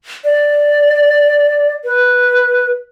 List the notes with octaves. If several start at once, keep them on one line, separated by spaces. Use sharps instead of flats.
D5
B4